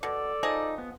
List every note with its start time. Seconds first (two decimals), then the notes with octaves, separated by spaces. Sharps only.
0.03 B2 A4 D5
0.43 F3 D#4 G#4 D#5
0.78 B3